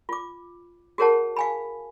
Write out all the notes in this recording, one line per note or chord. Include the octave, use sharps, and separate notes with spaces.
F4 D6
F#4 G#4 A#4 C#5 F#5 A5
F5 G#5 B5